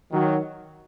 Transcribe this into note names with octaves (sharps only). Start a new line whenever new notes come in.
D#3 F#3